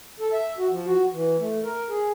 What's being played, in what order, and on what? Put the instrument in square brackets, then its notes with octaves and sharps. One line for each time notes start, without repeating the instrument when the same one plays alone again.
[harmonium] A4
E5
F#4
F3
F#4
E3
A3
A#4
G#4